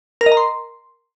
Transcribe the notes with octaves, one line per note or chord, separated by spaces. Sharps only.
A#4
D#5
A#5
C6